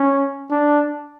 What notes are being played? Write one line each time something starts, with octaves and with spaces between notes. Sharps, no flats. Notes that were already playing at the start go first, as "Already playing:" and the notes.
Already playing: C#4
D4